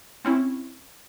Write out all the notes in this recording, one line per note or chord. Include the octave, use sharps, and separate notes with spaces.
C4 C#4 E4